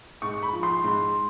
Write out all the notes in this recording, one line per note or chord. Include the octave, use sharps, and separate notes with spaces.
G#2 C#6
B5
F3
C6
G#2